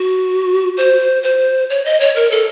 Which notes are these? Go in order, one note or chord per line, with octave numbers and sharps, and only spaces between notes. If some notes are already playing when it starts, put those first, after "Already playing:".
Already playing: F#4
C5
C5
C#5
D#5
C#5
A#4
A4